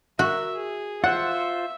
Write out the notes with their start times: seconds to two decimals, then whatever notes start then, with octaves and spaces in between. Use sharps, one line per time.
0.19 F#4 A#4 E5
0.55 G#4
1.04 F4 C5 E5 F#5